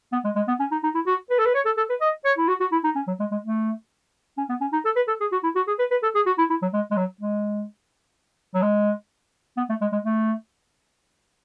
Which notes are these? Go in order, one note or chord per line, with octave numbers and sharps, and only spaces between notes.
B3
G#3
G#3
B3
C#4
D#4
D#4
E4
F#4
B4
A4
B4
C#5
A4
A4
B4
D#5
C#5
E4
F#4
F#4
E4
D#4
C#4
F#3
G#3
G#3
A3
C#4
B3
C#4
D#4
A4
B4
A4
G#4
F#4
E4
F#4
G#4
B4
B4
A4
G#4
F#4
E4
E4
F#3
G#3
G#3
F#3
G#3
F#3
G#3
B3
A3
G#3
G#3
A3